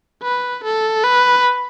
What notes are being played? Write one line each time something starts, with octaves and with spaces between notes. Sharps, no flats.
B4
A4
B4